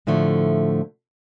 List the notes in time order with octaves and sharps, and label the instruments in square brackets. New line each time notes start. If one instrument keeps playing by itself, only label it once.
[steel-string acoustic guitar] A2 D3 F3 A3